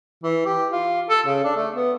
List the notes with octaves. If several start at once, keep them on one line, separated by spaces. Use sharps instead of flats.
E3
G4
F4
A4
C#3
D4
A3
B3